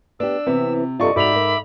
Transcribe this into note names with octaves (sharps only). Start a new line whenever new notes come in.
B3 D4 G4 E6
C3 E3 B3 C4
G2 C3 F4 A4 D5 D#5 C#6
G#2 F#4 D5 E5 F#5 B5 D6 F7
A#4